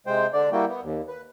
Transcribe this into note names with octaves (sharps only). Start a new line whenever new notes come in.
C3 G#3 C5 G5
D3 D4 D5
G3 A#3 E4 F#4 G5
B3
D#2
B4